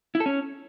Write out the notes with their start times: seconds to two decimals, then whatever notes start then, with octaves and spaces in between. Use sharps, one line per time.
0.15 E4
0.20 A4
0.26 C#4